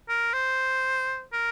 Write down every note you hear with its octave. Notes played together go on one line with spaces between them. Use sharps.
A#4
C5
A#4